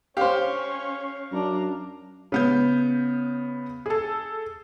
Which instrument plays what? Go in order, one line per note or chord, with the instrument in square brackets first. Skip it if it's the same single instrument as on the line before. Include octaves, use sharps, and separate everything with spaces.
[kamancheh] C#4 C#5 [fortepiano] G4 C5 [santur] F5
[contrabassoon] F#2 [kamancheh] D4 A#5
[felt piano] C#3 B3 G6
G#4 A4